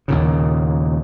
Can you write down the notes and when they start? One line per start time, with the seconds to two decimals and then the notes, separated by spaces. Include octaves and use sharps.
0.08 D#2 A#2 C#3